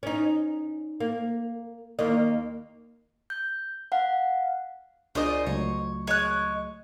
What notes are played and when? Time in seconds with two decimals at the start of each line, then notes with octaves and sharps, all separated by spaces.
0.03 C#4 D#4
1.00 A#3
1.99 D#2 A#3 D#5
3.30 G6
3.92 F5 F#5
5.15 C#2 C#3 D4 F4 A#4 C5 D5 D#5
5.47 C#2 F#3 A3 C#5
6.07 G#3 C#5 F#6